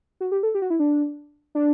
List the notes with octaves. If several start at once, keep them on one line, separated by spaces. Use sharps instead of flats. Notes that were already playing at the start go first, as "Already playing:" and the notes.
F#4
G4
A4
G4
F#4
E4
D4
D4